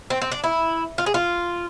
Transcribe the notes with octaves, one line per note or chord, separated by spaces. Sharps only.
C4
C4
D4
E4
F4
G#4
F4